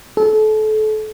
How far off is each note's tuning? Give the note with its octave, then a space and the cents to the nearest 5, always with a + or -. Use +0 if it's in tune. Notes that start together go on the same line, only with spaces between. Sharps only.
A4 -30